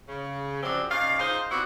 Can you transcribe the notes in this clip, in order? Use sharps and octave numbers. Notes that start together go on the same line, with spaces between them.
C#3
F#2 C3 F3 C4 D4
C#3 D#4 D5 F5
D#4 F4 G#4 C5
C3 B3 D4 E4 F#4